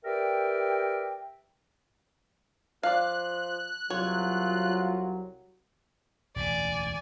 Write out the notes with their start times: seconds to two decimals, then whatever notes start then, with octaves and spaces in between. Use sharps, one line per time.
0.04 G4 A#4 B4 D5 E5 G5
2.83 F3 D5 F5 F#6
3.90 C2 F#3 F4 C#5
6.36 E1 A1 D2 D5 G#5